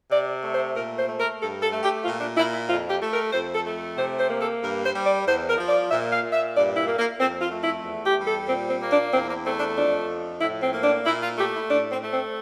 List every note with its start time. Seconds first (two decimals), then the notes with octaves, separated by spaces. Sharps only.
0.12 C3 D5
0.43 A3
0.54 C5
0.75 A#2 A#4
0.97 C5
1.09 A3
1.18 A#4
1.41 G2 A4
1.62 A4
1.72 A3
1.83 G4
2.04 A#2 F4
2.20 D4
2.37 A#2 E4
2.53 E4
2.69 F2 F4
2.90 G4
3.00 A3
3.12 A#4
3.33 F2 C5
3.54 A4
3.65 A3
3.97 C3 C5
4.20 C5
4.30 A#3
4.41 A4
4.62 G2 A#4
4.84 C5
4.94 G3
5.04 D5
5.26 E2 C5
5.48 A#4
5.58 F3
5.69 D5
5.90 A#2 E5
6.12 F5
6.23 A#2
6.33 E5
6.55 G2 D5
6.77 E4
6.87 A#3
6.98 A#3
7.19 F2 C4
7.41 F4
7.51 A3
7.62 E4
7.83 E2
8.06 G4
8.16 G3
8.27 A4
8.48 A#2 C4
8.70 C4
8.80 A#3
8.91 D4
9.12 E2 C4
9.28 A#3
9.44 A3 C4
9.60 D4
9.77 F2 D4
10.08 F3
10.40 A2 E4
10.62 C4
10.74 A#3
10.84 D4
11.06 A#2 E4
11.22 F4
11.37 A3 G4
11.54 E4
11.70 A2 D4
11.92 C4
12.02 A3
12.13 C4